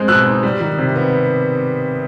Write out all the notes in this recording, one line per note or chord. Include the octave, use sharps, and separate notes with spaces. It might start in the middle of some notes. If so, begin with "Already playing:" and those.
Already playing: G#3 C4 G6
B2 E6 F#6
D#4
G3
D#3
C3
B3